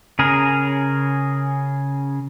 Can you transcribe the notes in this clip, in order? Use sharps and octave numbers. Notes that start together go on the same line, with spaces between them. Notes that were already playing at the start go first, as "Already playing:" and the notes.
C#3 G#4 A#4